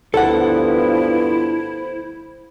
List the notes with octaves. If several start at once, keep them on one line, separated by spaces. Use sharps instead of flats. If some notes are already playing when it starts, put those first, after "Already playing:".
D2 G2 F3 B3 E4 A4 C5 F#5